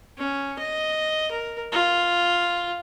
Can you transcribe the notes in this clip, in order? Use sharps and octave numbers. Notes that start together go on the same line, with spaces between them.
C#4
D#5
A#4
F4